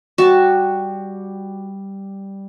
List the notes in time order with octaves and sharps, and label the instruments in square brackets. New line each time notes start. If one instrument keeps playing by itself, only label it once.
[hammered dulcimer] G3 [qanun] F#4 A5